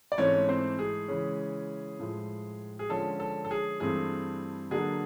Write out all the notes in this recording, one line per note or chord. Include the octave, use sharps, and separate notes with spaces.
D5
G#2 E3 A3 C4 C#4 C#5
C4 C5
G#4
C#3 E3 G#3 C#4
A2 F3 G#3
G#4
D3 F3 G#3 C#4 A4
A4
A4
G#4
G2 E3 A3 C4 G#4
D3 F#3 A#3 D4 G#4